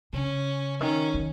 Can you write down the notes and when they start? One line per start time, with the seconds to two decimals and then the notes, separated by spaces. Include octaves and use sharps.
0.13 C#3 C#4
0.80 D#3 C#4
1.14 D#3